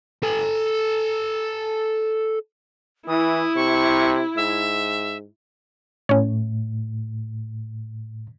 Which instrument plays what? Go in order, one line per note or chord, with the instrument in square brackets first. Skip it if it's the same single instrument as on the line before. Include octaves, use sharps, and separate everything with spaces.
[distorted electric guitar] A4 G#5
[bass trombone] E3 [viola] E4 [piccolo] D#6
[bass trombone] C3 [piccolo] C#6
[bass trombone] G#2 [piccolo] E5
[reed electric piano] A2 [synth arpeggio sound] C#4 C#5